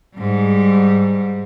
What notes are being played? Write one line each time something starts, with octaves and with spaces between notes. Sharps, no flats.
G#2 G3